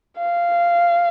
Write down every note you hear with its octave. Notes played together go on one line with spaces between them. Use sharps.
F5